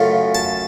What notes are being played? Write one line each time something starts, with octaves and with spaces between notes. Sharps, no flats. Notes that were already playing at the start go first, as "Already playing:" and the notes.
Already playing: F#2 C#3 F#3 A3 F4
A5